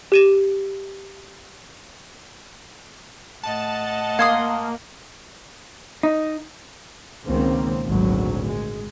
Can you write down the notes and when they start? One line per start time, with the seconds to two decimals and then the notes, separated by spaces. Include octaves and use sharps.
0.12 G4 D#7 E7
3.43 A2 D#5 F#5 A5
4.19 A#3 F5 A5 C6 D#6 G#6
6.03 D#4
7.26 C#2 B2 D#3 A#3 C4
7.86 G#1 D2 A#2 F#3
8.46 G#3